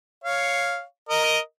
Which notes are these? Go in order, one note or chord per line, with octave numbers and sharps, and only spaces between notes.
C#5 F5
A#4 D#5